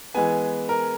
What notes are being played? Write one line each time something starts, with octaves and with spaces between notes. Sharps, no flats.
E3 G#3 B3 G#5
A#4